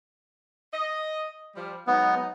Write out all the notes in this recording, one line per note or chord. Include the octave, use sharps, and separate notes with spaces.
D#5
F3 G3
F#3 G#3 B3 D#4